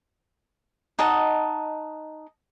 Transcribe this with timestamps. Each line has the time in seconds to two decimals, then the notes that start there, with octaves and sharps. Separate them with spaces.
0.99 D#4 D#5 F#5 A5